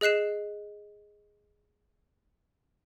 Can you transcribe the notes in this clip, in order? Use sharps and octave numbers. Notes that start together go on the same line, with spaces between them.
G#4 D#5 F#6 C7 E7